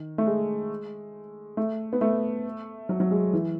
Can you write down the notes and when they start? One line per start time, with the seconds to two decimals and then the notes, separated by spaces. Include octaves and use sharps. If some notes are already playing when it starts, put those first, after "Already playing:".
Already playing: D#3
0.18 A3
0.26 G#3
1.57 A3
1.93 B3
2.01 A3
2.89 F#3
3.00 F#3
3.11 G#3
3.33 E3